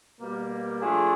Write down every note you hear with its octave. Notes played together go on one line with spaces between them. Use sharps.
B2 G3 A#3
F3 A3 D4 F4 G#4